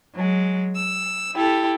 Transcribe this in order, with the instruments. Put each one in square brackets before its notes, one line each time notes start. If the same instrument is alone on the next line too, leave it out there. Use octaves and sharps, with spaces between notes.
[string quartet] F#3 G#3
E6
E4 G4 A4